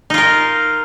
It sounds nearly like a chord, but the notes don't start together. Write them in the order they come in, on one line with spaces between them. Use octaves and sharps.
D#4 F4 A#4